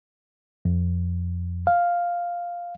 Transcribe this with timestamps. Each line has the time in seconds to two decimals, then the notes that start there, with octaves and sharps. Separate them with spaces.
0.65 F2
1.67 F5